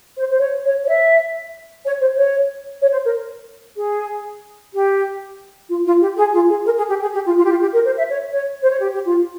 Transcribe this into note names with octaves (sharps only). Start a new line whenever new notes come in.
C5
C5
C#5
C#5
C#5
E5
C#5
C5
C#5
C#5
C5
A#4
G#4
G4
F4
F4
G4
G#4
F4
G#4
A#4
G#4
G4
G#4
G4
F4
F4
G4
F4
G4
A#4
C5
E5
C#5
C#5
C5
C#5
G4
G4
F4